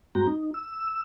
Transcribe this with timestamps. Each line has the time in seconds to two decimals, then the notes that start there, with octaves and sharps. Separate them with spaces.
0.15 G2 G#3 C4 F#4 G5 A#5
0.27 D#4
0.54 E6